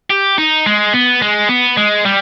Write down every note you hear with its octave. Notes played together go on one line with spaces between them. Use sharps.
G4
D#4
G#3
B3
G#3
B3
G#3
G3